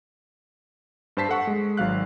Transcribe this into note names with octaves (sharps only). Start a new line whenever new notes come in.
G2 C5 A5 B6 C7
A4 F#5 C#6
G#3
G#1 F#3 F5 F#6